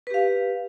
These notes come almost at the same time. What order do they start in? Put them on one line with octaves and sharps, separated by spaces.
B4 G4 F5